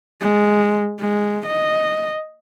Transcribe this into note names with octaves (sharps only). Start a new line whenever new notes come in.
G#3
G#3
D#5